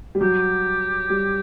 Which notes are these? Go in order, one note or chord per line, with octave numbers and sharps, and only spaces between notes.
G3
F#3 G4
G3